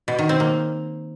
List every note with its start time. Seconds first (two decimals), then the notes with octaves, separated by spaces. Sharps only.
0.08 B2
0.19 D#3
0.29 C4
0.40 A#3